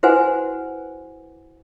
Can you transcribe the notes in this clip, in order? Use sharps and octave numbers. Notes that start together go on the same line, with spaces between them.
E4 F#4 B4 C5 F#5 G#5